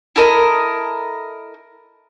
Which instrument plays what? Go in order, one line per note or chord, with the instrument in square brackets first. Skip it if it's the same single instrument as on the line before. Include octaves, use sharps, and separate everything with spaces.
[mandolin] E4 A4 A#4 D#5